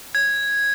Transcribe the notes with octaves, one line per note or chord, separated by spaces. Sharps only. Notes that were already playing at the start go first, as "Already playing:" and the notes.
G#6